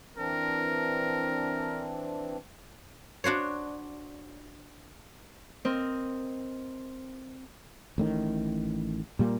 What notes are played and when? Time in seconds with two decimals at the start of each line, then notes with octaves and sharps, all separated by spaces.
0.17 E3 C4 D4 A#4
3.24 D4 F#4 C5 C#5
5.65 C4 A#4 D#5
7.98 A1 A2 D#3
9.19 A#2 G3 A#3